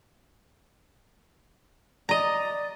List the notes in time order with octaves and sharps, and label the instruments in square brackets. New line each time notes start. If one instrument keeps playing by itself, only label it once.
[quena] D5 [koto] D#5 A#5